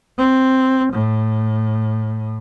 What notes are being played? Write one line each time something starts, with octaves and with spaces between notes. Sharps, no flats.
C4
A2